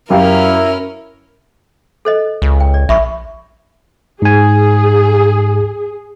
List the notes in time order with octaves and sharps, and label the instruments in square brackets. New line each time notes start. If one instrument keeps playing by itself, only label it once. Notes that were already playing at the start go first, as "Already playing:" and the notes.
[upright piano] F#2 G4 F5 [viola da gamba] C#4 A#4 [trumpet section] E4
[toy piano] A4 C5 D#5
[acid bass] C#2
[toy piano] G5
D5
[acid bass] A#1 [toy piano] E5 B5 C#6
[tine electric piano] G#2 G#5 [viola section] G#4